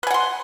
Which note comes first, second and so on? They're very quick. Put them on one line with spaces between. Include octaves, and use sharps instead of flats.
B4 G#5 F#5 C6